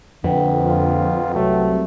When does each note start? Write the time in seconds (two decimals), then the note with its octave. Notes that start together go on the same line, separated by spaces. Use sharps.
0.24 A#1 F2 D3 F3 B4 F#5 G5
0.64 F4
1.34 C2 F#3 A3